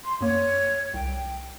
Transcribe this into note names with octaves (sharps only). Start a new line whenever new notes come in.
C6
F#2 A#3 C#5
C2 G5